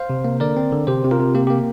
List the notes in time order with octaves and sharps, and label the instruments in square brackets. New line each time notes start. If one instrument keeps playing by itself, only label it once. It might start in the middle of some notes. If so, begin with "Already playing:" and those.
Already playing: [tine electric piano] C5 F5
C3
A#3
D3 A#4 D5
C4
D3
C3 G4 C5
C3
F4 A#4
C3
A#3 G4
A#3 G4